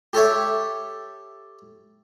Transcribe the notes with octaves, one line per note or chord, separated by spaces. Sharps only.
G4 A4 C#5 E5